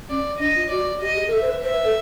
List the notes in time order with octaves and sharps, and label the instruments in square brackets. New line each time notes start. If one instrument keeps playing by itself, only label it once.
[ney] C#4 [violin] D5
[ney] D4 [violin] D#5
[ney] F4
[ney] F#4 [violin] D5
[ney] G4 [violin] D#5
[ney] G#4
A#4
[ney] A4 [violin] E5
[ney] C5
B4
[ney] C5 [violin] E5
[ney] B4
A4